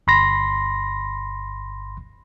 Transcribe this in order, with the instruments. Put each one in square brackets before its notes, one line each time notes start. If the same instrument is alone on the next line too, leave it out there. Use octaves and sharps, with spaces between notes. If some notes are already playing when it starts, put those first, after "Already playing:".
[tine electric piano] G1 B5 C6 A#6